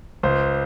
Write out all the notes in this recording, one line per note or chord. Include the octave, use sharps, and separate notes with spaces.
C#2 C5